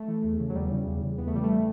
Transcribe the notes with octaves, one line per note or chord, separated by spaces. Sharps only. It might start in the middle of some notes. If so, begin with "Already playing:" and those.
Already playing: A3
E3
E2
C#3 E3
F#3
E2 G3
C#3 E3
E2
C#3 E3
E2 B3
A3
C#3 E3 G3
A3